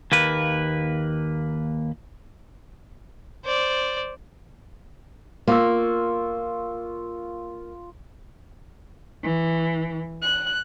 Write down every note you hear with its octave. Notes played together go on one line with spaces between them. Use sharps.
D#2 A#3 B4
C5 D5
A#3 F4 C#6 E6
E3
F#6